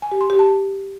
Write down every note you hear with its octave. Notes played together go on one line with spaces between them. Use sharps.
G#5
G4
C6
G4
A5